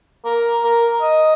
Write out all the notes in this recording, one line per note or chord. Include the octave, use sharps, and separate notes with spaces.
A#4
A#4
D#5